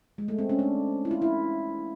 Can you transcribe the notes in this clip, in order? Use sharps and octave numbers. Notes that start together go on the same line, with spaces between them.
G#3
A3
C4
C#4
D4
E4
F4
E4